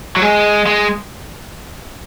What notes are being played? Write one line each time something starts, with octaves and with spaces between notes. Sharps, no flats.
F#3
G#3
G#3